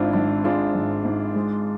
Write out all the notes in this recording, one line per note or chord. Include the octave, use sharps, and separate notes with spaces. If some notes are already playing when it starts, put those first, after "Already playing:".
Already playing: G#1 G#2 C4 D4 E4 F4
G#1 D4
G#3 D4 F4
G#1
G#2
G#3